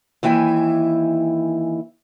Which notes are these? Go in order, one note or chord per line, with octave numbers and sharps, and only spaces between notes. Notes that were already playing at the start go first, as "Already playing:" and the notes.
D#2 E3 E4 E5 G5 G#5